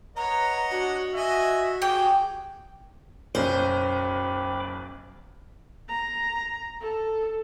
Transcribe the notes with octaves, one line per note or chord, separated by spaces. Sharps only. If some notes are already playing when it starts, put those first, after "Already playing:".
B4 C#5 D#5 F#5 A#5
D4 F#4
D#5 E5 G#5
F#3 G4 G#4 G5 D6
F#1 B1 C#4 C5 G5 B5 D6
A#5
A4